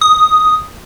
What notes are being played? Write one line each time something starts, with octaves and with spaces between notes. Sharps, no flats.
D#6